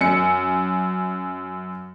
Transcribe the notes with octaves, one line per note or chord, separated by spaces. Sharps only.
F#2 C#7